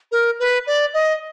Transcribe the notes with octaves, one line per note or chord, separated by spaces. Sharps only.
A#4
B4
D5
D#5